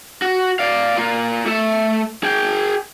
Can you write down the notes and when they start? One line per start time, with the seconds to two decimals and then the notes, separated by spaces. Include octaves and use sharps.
0.22 F#4
0.59 D5 F5
0.98 A#3 F4
1.46 A3 E5
2.23 G#4 G5